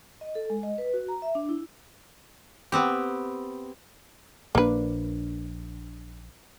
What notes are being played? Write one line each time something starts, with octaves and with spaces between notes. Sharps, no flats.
D#5
A4
G#3
D#5
B4
F#4
A#5
E5
D4
E4
B3 C4 G4
A#1 F3 A#3 D4 B4